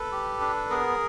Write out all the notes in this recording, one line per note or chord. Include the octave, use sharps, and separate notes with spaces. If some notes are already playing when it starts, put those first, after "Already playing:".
Already playing: A4 B4
G4
D4
B3 G#4 A#4